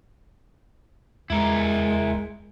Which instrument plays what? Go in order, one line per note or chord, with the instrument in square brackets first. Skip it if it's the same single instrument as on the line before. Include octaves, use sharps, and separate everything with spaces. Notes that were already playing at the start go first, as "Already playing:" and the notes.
[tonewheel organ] E2 [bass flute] G#3 [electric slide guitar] E4 A#4